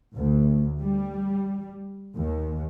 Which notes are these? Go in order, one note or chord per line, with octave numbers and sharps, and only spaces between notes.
D2
G3
D#2